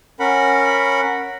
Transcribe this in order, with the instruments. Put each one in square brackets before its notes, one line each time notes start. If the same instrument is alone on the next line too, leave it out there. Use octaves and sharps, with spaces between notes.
[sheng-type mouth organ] C#4 A#4 F#5 B5